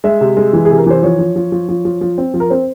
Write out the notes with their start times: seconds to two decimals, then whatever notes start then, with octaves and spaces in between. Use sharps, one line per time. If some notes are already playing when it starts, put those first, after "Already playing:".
0.04 G#3 E5
0.21 C3
0.37 G#3
0.53 E3
0.65 C3 G#4
0.78 A#4
0.87 E3 C5
1.03 F3 C#5
1.19 F3
1.36 F3
1.52 F3
1.69 F3
1.85 F3
2.01 F3
2.18 C4
2.34 F3
2.40 A#4
2.50 C4 C5